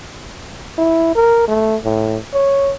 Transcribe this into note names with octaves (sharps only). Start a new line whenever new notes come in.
E4
A#4
A3
A2
C#5